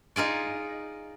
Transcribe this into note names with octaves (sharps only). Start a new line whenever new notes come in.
D#4 F4 G#4 D5